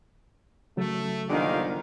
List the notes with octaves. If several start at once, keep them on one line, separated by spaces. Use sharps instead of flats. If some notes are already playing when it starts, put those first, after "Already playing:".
C#3 F#3 A3
G1 A#2 D3 D#3 F3 G4 F5